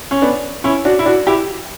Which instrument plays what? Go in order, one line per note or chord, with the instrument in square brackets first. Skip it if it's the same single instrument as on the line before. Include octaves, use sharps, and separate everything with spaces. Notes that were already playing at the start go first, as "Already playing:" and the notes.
[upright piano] C#4
B3 D4
C#4 E4
D4 F#4
E4
D4 F#4
E4 G4